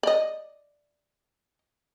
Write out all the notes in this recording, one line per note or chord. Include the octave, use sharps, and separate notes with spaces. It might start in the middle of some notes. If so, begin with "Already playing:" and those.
D5 D#5